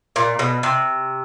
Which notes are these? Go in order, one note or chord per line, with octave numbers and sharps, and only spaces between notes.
A#2
B2
C3